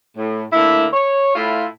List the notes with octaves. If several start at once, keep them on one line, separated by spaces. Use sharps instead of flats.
A2
D3 A3 A#3 E4
C#5
A2 E4 F4